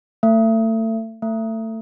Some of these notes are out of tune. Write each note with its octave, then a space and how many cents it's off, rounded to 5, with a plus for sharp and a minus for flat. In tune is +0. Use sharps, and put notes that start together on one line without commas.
A3 +30
A3 +25